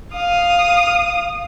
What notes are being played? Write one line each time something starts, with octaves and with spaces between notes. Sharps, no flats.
F5 D#6